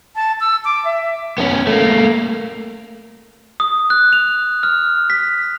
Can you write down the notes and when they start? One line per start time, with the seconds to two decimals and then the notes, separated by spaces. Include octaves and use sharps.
0.16 A5
0.40 E6
0.65 D6
0.85 E5
1.38 B3 C#4
1.67 A3 A#3
3.60 D#6
3.90 F#6
4.13 F7
4.63 F6
5.10 B6